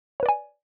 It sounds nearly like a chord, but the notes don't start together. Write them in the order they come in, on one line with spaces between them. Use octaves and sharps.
C#5 B4 D5 G#5